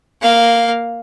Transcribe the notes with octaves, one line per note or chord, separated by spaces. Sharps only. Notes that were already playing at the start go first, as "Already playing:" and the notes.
A#3 F5